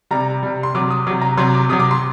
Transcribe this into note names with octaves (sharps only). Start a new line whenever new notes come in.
C3 G3 A#5
C3 G3
C6
C3 F#3 D6
D#6
C3 F#3 D6
A#5
C3 F#3 C6
D6
C3 F#3 D#6
D6
C6